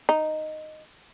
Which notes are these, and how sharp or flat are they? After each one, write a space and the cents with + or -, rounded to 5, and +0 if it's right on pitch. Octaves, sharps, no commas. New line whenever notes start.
D#4 -5